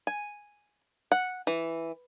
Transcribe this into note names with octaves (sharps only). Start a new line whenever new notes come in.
G#5
F#5
E3